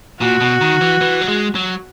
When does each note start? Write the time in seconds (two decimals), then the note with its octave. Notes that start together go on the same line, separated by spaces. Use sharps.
0.21 A#2 F#4
0.40 B2
0.61 D#3
0.81 E3
1.01 E3
1.21 F#3
1.28 G#3
1.55 F#3